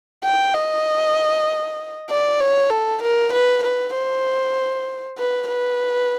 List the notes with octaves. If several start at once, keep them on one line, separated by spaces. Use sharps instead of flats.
G5
D#5
D5
C#5
A4
A#4
B4
B4
C5
B4
B4